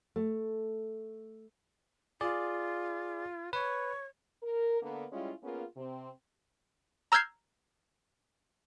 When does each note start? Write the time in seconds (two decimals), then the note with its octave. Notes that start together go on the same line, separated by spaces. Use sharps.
0.16 A3
2.21 F4 G#4 D5
3.53 B4 C#5
4.43 A#4
4.82 D3 A#3 B3
5.12 G3 G#3 C#4 E4 F4
5.43 A#3 B3 C#4 F4 G#4 A#4
5.77 C3 C4
7.12 A#5 E6 F6 G6 G#6 C7